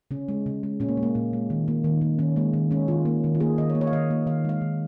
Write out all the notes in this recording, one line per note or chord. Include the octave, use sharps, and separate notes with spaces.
C#3 C#4
G#3
C#3
G#3
A#2 C#4
A#3
G#3
A#3
A#2
G#3
D#3
A#3
D#3
A#3
D#3 C#4
G#3 A#3
D#3
G#3 C#4
D#3 F4
A#3
D#3
F4
A#3 G#4
D#3 D#5
C#5
A#3
C#5
F5
D#3 D#5
A#3
D#3 F5
G#3 F5
D#3